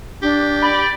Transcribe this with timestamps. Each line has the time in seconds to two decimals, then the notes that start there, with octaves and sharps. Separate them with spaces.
0.22 D4 G4
0.62 D5 B5